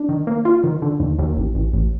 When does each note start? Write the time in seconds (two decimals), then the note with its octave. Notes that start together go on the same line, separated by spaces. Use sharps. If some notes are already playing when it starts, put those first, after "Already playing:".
Already playing: D4
0.09 D#3
0.27 A#3
0.45 F4
0.64 D#3
0.82 D3
1.00 D#2
1.19 D#2
1.37 A1
1.55 A1
1.74 A1